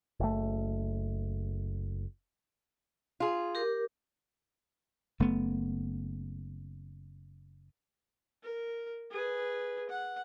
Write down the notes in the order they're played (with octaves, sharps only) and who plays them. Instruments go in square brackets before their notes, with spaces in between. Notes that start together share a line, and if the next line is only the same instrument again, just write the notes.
[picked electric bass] F#1 A3
[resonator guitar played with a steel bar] F4 G#4
[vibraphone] G4 A#4 D6
[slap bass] F#1 A3 B3
[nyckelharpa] A#4
G#4 B4
F#5